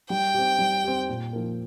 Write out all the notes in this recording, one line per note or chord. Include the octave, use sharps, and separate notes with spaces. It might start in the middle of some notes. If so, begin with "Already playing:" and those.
G3 G5
C4 G4
G3
C4 G4
A#2
F3 A#3